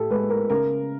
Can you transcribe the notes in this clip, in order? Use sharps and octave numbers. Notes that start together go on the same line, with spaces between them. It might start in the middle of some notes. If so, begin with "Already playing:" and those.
Already playing: A2 G4 A4
G#3 B4
A#4
C#3 A#4